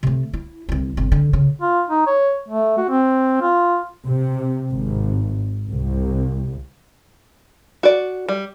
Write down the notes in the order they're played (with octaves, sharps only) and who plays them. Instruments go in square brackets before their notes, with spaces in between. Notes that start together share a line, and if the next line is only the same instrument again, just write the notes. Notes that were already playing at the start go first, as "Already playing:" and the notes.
[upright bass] C3 A3
E4
C2 E4
G1 C3
D3
C#3
[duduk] F4
D#4
C#5
A3
F#4
C4
F4
[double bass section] C3
G#1
C2
[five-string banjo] F#4 D5
G3